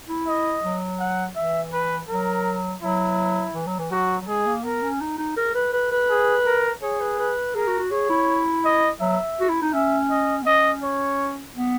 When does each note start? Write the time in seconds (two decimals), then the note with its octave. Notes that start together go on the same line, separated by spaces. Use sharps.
0.09 E4
0.27 D#5
0.63 F#3
0.99 F#5
1.36 E3 E5
1.72 B4
2.09 F#3 A#4
2.82 F#3 E4
3.55 E3
3.67 F#3
3.79 E3
3.91 F#3 F#4
4.21 F#3
4.27 G#3 G#4
4.46 A#3
4.64 B3 A#4
4.82 C#4
5.01 D#4
5.18 D#4
5.37 A#4
5.55 B4
5.73 B4
5.91 B4
6.09 G#4
6.46 A#4
6.82 G#4 C#5
7.00 B4
7.19 B4
7.55 G#4 A#4
7.67 F#4
7.79 F#4
7.91 G#4 C#5
8.10 E4
8.64 D#5
9.00 F#3 E5
9.40 F#4
9.49 E4
9.62 D#4
9.73 C#4 E5
10.10 D#5
10.42 B3
10.46 C#4 D#5
10.83 C#5
11.56 B3